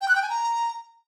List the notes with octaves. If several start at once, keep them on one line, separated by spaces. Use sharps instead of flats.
G5
F#6
G5
G#5
A#5